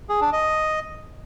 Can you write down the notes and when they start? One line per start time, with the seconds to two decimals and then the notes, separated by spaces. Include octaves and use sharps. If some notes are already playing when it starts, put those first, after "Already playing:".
0.09 G#4
0.21 D4
0.33 D#5